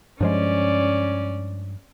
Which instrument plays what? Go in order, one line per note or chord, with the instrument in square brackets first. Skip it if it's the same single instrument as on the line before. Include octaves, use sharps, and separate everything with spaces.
[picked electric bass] G2 F3 G#3 [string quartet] C#4 D5